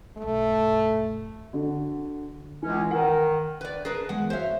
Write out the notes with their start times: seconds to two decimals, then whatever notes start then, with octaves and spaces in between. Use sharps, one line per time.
0.17 B1 G2 A3
1.53 D3 F#4
2.63 C#2 E3 C#4
2.91 D#3 B4 F#5
3.61 B4 D5
3.85 G#4 A#4 B4 A5
4.09 E2 G#3 F#5
4.30 F#4 C5 C#5 E5 F5